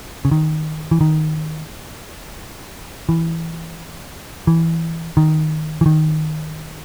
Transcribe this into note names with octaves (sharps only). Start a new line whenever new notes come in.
C#3
D#3
E3
D#3
E3
E3
D#3
E3
D#3